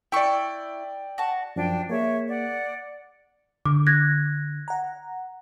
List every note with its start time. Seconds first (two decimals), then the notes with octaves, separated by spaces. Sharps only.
0.12 E4 D5 G5 C#6
1.18 F#4 A5
1.56 F#2 F3 D4 G5
1.90 A#3 G#4 C#5 E5
2.28 D5 F#5
3.65 D3 D6
3.87 F#6 G#6 A#6
4.68 F#5 A#5